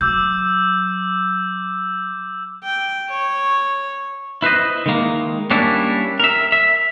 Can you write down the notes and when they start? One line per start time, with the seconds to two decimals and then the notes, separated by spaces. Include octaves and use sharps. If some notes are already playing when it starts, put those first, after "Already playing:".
0.01 F#3 D6 E6 G6
2.64 G5
3.10 C#5
4.42 E4 B4 C5 D#5
4.86 D#3 G#3 A#3
5.50 G3 A#3 C#4 D4 E4
6.20 A#4 E5
6.52 E5